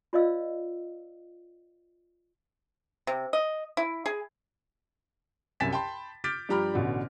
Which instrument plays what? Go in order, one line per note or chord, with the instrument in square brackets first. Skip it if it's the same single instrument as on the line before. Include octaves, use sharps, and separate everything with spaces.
[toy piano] F4 C5 D5 D#5 F5 E6
[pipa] C3
D#5
E4
G#4
[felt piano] C2 F#2 G#5 A6 B6 E7
G5 A5 B5 C6
D6 F6 G6 A6 B6 D7
G2 F3 G4 A#5 B5 F6
A1 B2 D3